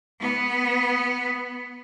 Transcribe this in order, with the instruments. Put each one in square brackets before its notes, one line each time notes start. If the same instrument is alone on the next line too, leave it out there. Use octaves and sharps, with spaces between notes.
[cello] B3